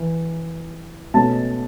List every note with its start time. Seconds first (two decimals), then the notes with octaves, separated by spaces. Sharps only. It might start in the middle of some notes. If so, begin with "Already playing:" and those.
Already playing: E3
1.14 B2 A3 C#4 A5